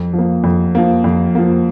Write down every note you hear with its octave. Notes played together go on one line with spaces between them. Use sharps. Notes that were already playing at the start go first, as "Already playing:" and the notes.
Already playing: F2
F3 A#3
F2
F3 A#3
F2
F3 A#3